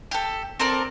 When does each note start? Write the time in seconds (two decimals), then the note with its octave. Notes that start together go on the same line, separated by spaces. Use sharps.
0.11 G4 A4
0.60 C4 A4 A#4 D5